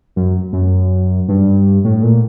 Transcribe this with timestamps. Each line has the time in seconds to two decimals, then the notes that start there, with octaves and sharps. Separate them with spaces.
0.16 F#2
0.53 F#2
1.29 G2
1.85 A2
2.03 A#2